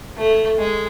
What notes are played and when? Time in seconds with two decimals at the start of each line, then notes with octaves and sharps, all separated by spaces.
0.18 A3
0.59 G#3